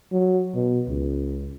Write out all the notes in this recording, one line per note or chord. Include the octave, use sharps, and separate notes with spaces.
F#3
B2
C#2